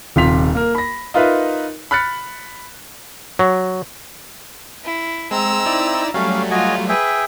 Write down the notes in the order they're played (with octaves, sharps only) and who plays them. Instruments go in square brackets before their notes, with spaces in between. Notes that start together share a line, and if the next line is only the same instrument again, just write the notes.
[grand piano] D#1 C3 F4 C6 B6 F7
A#3 A#4
B5 A#6
D#4 F4 A#4 B4 E5
B5 F6 F#6 A6 C#7
[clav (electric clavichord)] F#3
[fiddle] E4
[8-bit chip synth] G#3 [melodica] C4 [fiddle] A#5 E6
[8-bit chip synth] D#4 E4 D5
[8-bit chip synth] F#3 G3 A3 [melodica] C#4 F5
[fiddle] F4 [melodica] F#4 D#5 G#5
[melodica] G#4 E5 G5 [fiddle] B4